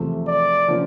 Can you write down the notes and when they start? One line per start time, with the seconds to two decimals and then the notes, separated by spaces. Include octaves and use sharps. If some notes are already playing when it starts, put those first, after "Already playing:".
Already playing: E2 C3 F3 A3
0.27 D5
0.68 D3 F3 A#3 C#4 F4